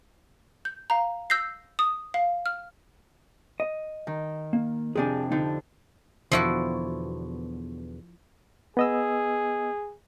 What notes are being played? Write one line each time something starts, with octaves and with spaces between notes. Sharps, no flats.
G6
F5 A#5
E6 G6 A#6 C7
D#6
F5
F6
D#5
D#3
A#3
F2 C3 D4 G#4 D5 G#5
D3 D#4
E2 B2 D3 F3 E4 F#4
B3 G#4 D#5 E6